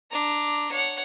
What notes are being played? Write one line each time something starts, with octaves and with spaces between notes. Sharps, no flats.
D4 A#5
C#5 F#5